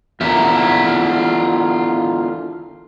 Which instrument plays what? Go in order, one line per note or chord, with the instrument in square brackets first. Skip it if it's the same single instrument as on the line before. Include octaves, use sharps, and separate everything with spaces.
[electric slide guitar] E2 D3 A#4 [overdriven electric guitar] F4 E5